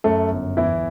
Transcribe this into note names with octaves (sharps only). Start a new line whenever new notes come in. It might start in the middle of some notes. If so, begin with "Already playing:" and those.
F#2 A3 A4
G1
E2 E3 E4